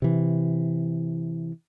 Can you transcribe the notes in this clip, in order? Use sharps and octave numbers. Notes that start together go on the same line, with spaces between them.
C3 E3